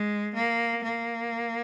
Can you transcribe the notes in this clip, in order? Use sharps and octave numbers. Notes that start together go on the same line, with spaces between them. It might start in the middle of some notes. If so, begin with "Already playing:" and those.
Already playing: G#3
A#3
A#3